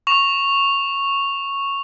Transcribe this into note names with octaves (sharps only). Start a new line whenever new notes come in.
C#6 F7